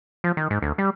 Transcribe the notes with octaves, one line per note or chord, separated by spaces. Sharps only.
F3
D#3
G#2
D2
G3